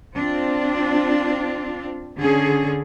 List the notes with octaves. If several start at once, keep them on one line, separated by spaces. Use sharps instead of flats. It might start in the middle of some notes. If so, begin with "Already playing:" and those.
C4 D4 F4
D3 C#4 G#4